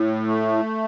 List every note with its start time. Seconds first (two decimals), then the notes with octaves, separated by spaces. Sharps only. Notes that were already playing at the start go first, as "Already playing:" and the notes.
Already playing: A2
0.27 A3